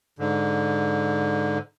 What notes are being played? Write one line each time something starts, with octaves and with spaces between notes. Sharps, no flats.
G#2 D3